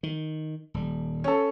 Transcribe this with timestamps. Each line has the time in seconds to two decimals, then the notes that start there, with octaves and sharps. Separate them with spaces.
0.03 D#3
0.74 D#1 G3
1.24 C#4 A4